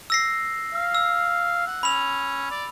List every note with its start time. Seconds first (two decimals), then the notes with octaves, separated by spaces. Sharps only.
0.10 E6 A#6 C7
0.74 F5
0.95 E6
1.67 F#5
1.83 C#4 B5 F7
2.51 D5